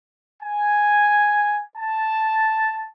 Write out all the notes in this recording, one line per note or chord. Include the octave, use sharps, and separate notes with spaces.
G#5
A5